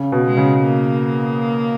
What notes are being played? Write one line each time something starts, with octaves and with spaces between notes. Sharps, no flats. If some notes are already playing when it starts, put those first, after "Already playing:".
Already playing: C#3
B2
G#3
C#3
A#3